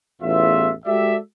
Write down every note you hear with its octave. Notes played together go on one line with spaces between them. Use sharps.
A1 E2 F4 E5
G#3 F#4 G4 A4 D5 E5